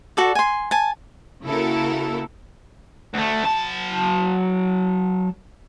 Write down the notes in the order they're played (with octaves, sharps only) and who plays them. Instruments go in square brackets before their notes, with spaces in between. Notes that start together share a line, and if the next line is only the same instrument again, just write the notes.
[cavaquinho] F#4 A4 D5
G#5 C6
G#5 A5
[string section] C#3 A#3 E4 F#4 A4 A#4
[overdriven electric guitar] D2 A3
F#3 A5